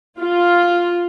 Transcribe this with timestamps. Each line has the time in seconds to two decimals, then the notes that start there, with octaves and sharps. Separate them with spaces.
0.19 F4